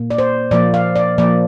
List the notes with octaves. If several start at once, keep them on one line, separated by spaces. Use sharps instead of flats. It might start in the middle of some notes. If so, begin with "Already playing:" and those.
Already playing: A#2 A#3
D5
C5
A#2 F3 A#3 D5
F5
D5
A#2 F3 A#3 D5